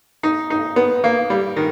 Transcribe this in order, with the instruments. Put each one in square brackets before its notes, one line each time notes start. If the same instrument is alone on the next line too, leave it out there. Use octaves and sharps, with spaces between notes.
[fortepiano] D#4
D#4
B3
A#3
G3
D#3